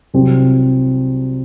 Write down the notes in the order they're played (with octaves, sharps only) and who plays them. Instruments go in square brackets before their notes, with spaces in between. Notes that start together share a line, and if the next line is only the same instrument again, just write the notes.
[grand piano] C2 C3 F#3 C4